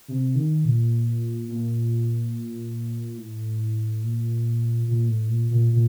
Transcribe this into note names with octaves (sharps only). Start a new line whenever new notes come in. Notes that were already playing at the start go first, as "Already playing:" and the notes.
C3
D#3
A#2
A#2
A2
A#2
A#2
A2
A#2
A#2
A#2